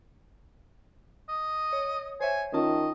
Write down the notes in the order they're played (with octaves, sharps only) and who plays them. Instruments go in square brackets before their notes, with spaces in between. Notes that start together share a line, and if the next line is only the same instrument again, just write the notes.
[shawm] D#5
[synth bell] C#5
[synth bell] C5 C#5 E5 [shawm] G#5
[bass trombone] D#3 [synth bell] C#4 F4 A5 [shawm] D#5